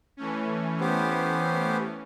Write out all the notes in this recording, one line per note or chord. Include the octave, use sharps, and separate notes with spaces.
E3 A3 C#4
B3 G4 C5